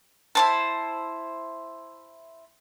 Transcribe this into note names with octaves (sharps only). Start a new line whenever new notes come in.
E4 C5 A5